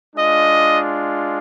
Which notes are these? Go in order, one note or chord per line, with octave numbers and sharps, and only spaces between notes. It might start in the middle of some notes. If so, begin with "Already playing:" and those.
G#3 D4 F4 D#5